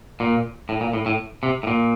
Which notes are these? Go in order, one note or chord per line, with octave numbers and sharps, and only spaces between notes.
A#2
A2
A#2
A2
A2
C3
A2
A#2